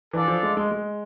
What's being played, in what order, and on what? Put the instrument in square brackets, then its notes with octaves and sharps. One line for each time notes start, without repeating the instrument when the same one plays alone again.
[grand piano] E3 [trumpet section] D4 A4 D5 F5
[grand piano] F3
G#3
G#3
G#3